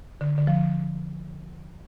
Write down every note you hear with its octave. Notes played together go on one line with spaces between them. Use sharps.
D3
D3
F3